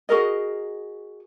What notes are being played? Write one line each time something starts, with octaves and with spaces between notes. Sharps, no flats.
F#4 G#4 A#4 D#5